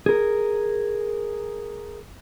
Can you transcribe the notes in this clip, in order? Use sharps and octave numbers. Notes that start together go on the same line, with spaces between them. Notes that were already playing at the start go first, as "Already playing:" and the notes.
G#4 A#4